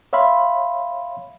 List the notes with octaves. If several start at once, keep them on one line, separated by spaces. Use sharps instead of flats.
C#5 E5 F5 B5 C6